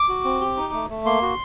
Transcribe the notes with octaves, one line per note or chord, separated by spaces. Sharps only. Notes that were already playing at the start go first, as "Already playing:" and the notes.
Already playing: D6
F#4
C4
G4
D#4
A3
A3
A#3 C6
F#4